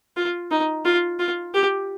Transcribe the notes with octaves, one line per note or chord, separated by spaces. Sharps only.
F4
D#4
F4
F4
G4